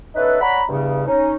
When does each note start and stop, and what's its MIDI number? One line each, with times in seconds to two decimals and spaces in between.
0.15 0.37 59
0.15 0.37 61
0.15 0.37 63
0.15 0.37 64
0.15 0.37 69
0.15 0.37 71
0.41 0.61 73
0.41 0.61 74
0.41 0.61 78
0.41 0.61 82
0.41 0.61 83
0.69 1.04 40
0.69 1.04 43
0.69 1.04 49
1.07 1.34 61
1.07 1.34 63